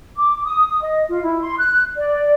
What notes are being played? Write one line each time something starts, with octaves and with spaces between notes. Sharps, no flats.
D6
D#6
D#5
F4
E4
C6
F#6
D5